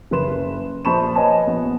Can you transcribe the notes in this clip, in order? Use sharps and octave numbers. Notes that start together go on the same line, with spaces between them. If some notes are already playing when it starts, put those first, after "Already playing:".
F#1 C#3 B4 C6 E7
A#1 C5 A5 B5 C#6 E7
B4 C#5 D#5 G#5 A5
A#1 B3